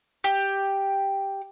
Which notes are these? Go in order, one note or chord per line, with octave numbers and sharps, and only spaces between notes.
G4